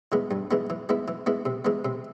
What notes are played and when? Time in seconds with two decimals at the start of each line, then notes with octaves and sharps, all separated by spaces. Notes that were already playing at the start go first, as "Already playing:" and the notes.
0.12 E3 G#3 B3
0.31 G2
0.51 E3 G#3 B3
0.70 E3
0.89 G#3 B3 E4
1.08 E3
1.26 G#3 B3 E4
1.45 C3
1.65 E3 G#3 B3
1.85 C3